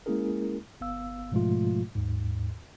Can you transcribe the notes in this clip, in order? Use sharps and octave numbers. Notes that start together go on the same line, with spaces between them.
G#3 A#3 C#4 E4 G#4 A#4
G1 B3 F5 E6
G#2 B2 F3 G#3 A3 F4
D#2 G#2